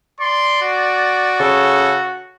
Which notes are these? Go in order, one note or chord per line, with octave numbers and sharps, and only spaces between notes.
D5 C6
F#4
C#3 A4